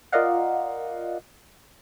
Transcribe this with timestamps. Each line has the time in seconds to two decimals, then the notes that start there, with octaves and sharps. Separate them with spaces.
0.12 F4 A#4 D5 D#5 F5 F#5